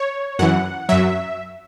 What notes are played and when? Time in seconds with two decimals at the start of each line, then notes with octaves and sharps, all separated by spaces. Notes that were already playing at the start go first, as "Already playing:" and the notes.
Already playing: C#5
0.39 F#2 E3 F#5
0.89 F#2 F#3 E5